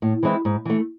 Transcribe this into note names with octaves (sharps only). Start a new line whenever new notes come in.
A2
E3 G#3 C4 E4
G#2
E3 A3